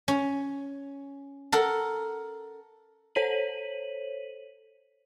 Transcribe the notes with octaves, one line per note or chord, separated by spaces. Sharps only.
C#4
A4 A#4 F#5
A4 C5 C#5 B6 D#7 F#7